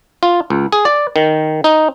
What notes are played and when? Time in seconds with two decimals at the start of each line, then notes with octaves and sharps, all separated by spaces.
0.23 F4
0.50 C#2
0.72 G#4
0.85 D5
1.16 D#3
1.64 D#4